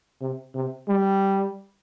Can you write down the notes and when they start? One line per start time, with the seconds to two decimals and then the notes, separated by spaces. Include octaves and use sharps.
0.21 C3
0.55 C3
0.88 G3